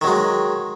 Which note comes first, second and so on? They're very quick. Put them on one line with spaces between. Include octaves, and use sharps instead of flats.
D#3 F#3 G#3